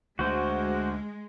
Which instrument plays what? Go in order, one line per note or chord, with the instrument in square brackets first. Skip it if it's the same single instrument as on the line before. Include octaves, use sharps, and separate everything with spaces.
[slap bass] D2 [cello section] G#3 [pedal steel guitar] F#4 C5